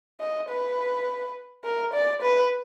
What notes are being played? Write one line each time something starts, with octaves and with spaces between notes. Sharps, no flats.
D#5
B4
A#4
D5
B4